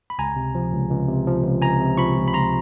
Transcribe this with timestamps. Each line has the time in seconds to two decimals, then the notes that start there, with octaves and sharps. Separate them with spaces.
0.10 B5
0.19 C#2 G#5 A#5
0.36 C3
0.55 F3
0.73 C#2
0.91 C#2
1.08 C3
1.27 F3
1.44 C#2
1.62 C#2 G#5 A#5
1.80 C3
1.97 F3 B5 C#6
2.16 C#2
2.28 B5
2.33 C#2 A#5 C6